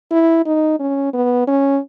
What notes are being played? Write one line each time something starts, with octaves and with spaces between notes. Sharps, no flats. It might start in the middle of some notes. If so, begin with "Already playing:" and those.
E4
D#4
C#4
B3
C#4